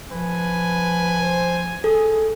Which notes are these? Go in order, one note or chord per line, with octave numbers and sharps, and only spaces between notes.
F3 B4 G#5
C5
G#4 A4